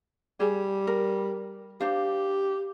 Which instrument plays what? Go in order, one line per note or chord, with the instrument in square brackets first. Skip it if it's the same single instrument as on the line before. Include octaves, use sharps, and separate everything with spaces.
[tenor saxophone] G3 [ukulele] G#4
[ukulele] A#4
[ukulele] D4 C5 F5 [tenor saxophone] G4